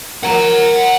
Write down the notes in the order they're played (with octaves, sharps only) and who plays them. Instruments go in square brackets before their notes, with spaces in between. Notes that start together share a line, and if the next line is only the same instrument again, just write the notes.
[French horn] A#4 [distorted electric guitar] F#5 A#5